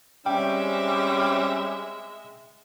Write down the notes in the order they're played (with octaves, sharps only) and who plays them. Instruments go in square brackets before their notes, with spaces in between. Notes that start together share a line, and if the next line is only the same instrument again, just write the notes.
[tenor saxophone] G3 [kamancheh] G#3 E5 [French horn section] C4 C#4 [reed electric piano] G5